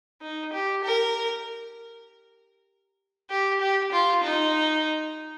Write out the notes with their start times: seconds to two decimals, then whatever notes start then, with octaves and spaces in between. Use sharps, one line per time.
0.22 D#4
0.53 G4
0.84 A#4
3.30 G4
3.61 G4
3.92 F4
4.23 D#4